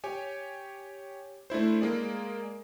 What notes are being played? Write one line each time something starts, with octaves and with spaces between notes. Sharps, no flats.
G4 C#5 G#5
A3 D4 E4 C5
G#3 A#3 G#4 D5